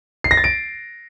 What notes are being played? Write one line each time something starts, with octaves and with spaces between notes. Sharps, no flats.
C7
A#6
A6
D7